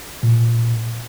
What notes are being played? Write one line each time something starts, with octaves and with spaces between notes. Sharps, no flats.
A#2